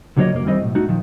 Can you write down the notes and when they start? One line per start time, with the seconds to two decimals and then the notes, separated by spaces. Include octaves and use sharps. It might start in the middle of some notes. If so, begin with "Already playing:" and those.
0.17 C#2 D3 F#3 A#3 C#5 D#5
0.32 C2 F#2 A#3
0.46 D#3 E3 G3 C4 D#5
0.61 B1 A2
0.75 A3 D#4 F#4
0.87 A#2 D#3 F3